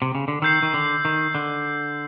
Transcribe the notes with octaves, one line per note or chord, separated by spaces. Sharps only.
C3
C#3
D3
D#3 E6 G6 C7
D#3
D3
D#3
D3